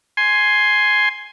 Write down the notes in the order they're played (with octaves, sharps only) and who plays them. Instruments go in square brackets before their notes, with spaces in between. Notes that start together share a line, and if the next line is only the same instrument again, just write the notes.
[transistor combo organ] G#5 C6